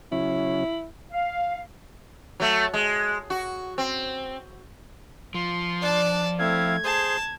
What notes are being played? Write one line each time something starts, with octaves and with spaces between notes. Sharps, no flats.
C#3 F#3 C#4 E4
F5
F#3 A3
G#3
F#4
C4
F3 C6
D4 D5 A5
A3 C4 E4 F5 G#6
G#4 C5 A5 C6